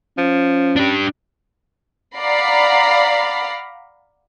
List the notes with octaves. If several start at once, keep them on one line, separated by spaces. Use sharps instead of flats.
F3 C#4
D4 G4
D5 F5 F#5 A#5 B5 C7